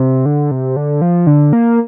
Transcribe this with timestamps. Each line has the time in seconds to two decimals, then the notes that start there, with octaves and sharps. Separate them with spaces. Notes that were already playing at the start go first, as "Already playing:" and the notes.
Already playing: C3
0.26 D3
0.51 C3
0.76 D3
1.02 F3
1.27 D3
1.53 A#3